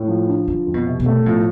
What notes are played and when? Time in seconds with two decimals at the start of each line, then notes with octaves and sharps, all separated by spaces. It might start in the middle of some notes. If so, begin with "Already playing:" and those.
Already playing: A2
0.08 F3
0.28 D4
0.47 D3 F3
0.66 F2
0.74 B2
0.86 C3
1.00 B2
1.06 A3
1.26 A2 F3